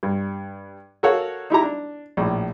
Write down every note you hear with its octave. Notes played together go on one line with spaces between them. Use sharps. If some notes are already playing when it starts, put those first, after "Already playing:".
G2
F#4 A4 A#4 C#5 F5 F#5
D#4 E4 G4 A#5
D4
A#1 A2